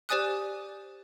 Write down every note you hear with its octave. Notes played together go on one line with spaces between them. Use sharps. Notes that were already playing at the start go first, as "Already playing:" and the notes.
G4 C5 D5 G#5 D#6 F#6